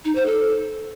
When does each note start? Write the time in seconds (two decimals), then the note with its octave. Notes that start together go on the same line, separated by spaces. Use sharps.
0.05 D#4
0.15 C5
0.26 A4